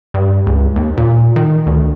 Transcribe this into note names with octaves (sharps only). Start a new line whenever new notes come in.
G2
C#2
D#2
A#2
D#3
D2